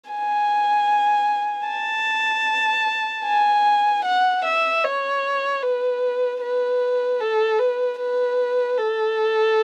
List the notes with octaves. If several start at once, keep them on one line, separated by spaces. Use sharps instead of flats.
G#5
A5
G#5
F#5
E5
C#5
B4
B4
A4
B4
B4
A4